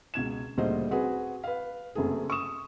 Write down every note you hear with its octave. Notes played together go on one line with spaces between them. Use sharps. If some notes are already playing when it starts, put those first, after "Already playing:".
C#2 B2 G#6 E7
D2 A#2 C#3 G3 C5 D#5
C4 F#4 G#4 B4
B4 F5
F#1 F#2 C3 A3 G#4
C#6 D#6 E7